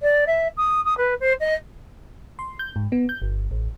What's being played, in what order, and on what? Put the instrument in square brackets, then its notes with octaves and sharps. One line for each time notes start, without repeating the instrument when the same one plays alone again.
[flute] D5
E5
D#6
D#6
B4
C5
D#5
[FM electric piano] C6
G6
G#2
B3
G6
G1
A1